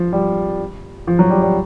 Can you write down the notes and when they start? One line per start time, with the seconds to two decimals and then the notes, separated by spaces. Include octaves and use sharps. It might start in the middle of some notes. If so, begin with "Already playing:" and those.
Already playing: F3
0.13 G3
1.07 F3
1.19 F#3
1.30 G3
1.42 G3